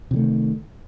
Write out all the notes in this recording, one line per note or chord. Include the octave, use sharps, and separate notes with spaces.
C3 D#3 E3 A3